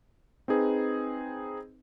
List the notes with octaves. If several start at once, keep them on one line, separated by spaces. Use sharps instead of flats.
C4 D#4 G#4 B4